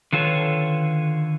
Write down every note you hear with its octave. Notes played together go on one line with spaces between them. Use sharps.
D3 D#3 F4 A4 B4 C#5